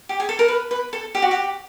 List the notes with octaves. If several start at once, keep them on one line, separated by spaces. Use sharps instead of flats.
G4
G#4
A4
A#4
B4
B4
A4
G4
F#4
G4